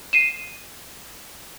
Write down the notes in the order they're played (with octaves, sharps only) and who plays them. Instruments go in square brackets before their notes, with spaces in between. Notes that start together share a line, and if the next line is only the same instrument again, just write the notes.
[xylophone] C7 D#7 E7